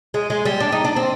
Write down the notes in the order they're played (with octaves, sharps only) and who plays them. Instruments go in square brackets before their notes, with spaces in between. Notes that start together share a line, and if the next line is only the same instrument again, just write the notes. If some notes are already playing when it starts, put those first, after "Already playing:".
[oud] G#3
G#3
G3
D4
D#4
D4
C4